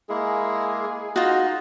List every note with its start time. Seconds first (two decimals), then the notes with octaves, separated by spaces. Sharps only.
0.09 G#3 A#3 E4 G#4
1.16 D#4 F4 F#4 D#5